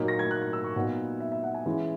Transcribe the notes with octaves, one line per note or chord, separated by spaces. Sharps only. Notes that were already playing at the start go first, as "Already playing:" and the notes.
Already playing: A#2 F#3 A#3 D#4
A#6
G#6
F#6
G#6
E6
C#6
A#2 F#3 B3 D#4 F#5
E5
E5
F#5
G#5
E3 G#3 C#4 E4